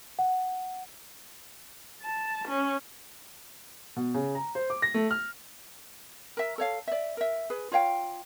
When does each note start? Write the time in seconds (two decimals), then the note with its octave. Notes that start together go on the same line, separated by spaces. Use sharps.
0.19 F#5
2.03 A5
2.48 C#4
3.96 B2
4.14 C#3
4.35 A#5
4.55 C5
4.70 D6
4.82 A#6
4.94 A3
5.11 F6
6.37 A#4 E5
6.58 A4 C#5 F5
6.88 D5 E5
7.17 A#4 E5
7.50 G#4 B4
7.72 F4 C#5 F5 G5